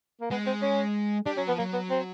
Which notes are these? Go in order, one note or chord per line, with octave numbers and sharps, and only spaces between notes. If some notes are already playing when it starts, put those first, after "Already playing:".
A#3
G#3 B3
C4
C#4
G3 D4
F#3 C#4
F3 B3
F#3 A#3
B3
C4